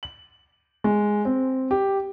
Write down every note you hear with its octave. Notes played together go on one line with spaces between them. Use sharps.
F#7
G#3
C4
G4